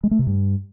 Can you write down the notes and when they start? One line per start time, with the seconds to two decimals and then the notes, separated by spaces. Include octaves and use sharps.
0.04 G#3
0.11 A3
0.19 C3
0.27 G2